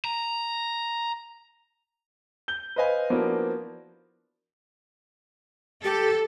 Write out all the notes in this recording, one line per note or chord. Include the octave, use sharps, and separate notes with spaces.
A#5
G6 G7
B4 C5 D#5 F5 G#5 B5
F3 A#3 B3 D4 E4 F#4
G4 A4